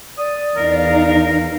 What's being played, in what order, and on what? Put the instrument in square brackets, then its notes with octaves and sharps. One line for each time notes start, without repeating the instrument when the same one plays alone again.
[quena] D5 [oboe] D#6
[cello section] E2 D#4 F5 [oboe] A#4